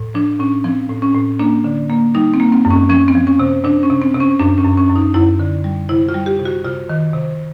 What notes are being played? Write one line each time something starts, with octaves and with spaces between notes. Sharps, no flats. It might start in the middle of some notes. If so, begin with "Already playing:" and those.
Already playing: A2
F3 D4
A2 C#4
F3 C4
A2
C#4
A2
A#3 D4
D3
A#3
G3 D#4
C4
A#3
C4
F#2
C#4
F3 C#4
C4
F3
C#4
C3
C3 D4
C#4
C3
C4
C3
C#4
F#2 D4
C#4
F#2
C#4
F#2
D#4
F#2 E4
D3
G3
C3 E4
F4
G3
G4
C3
F#4
C3 F4
D#3
C3